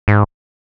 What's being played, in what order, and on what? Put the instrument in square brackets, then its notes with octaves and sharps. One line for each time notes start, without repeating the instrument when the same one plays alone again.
[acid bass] G#2